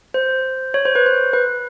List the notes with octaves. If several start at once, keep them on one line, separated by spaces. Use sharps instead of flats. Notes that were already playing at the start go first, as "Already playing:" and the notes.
C5
C#5
C5
B4
C5
B4